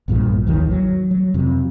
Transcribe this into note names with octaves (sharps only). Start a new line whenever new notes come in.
B1 G2 A#2 F3
G#1 D#2 D#3 E3
F#3
F#3
F2 C3